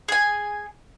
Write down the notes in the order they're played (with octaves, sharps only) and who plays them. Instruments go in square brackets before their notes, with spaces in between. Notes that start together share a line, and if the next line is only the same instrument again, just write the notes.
[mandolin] G#4 G#5